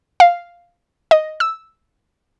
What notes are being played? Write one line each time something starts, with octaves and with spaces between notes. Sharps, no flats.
F5
D#5
E6